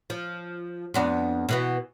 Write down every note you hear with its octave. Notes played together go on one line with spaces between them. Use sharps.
F3
F2 B3 D4
B2 E3 B3